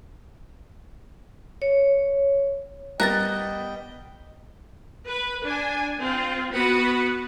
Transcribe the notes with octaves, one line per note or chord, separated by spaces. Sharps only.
C#5
G3 B3 A#4 D#5 G5 A#5 F#6 A6
B4
D4 G#5
C4 F4
B3 F#4 B4 F#5 B5